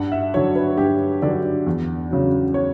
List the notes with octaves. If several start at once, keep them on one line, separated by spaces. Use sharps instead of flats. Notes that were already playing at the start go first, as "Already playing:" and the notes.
Already playing: G2 F#5
E5
D3 F#3 C#5
B4
G2 G4
D3 F#3 D5
E2
C#3 F#3
C#5